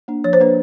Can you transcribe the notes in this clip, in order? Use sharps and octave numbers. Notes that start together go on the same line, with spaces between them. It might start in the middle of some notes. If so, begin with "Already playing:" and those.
A#3 D4
F3 C#5
C5
A#3 D4 B4